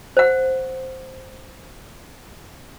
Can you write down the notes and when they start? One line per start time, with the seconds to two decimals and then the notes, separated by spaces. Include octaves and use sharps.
0.17 C5 F#5